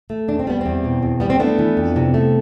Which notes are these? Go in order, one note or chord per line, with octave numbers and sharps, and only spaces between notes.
A3
E2 D4
C4
G3 B3
E2 C4
B2
E2
G3 B3
C4
A3 B3 D4
E3
F2
C3
A3